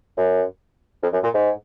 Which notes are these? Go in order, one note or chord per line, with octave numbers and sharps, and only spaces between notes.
F#2
F2
F#2
A#2
G#2